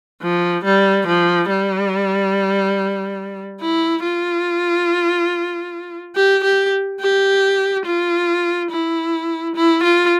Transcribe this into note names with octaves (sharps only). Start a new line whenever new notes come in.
F3
G3
F3
G3
E4
F4
G4
G4
G4
F4
E4
E4
F4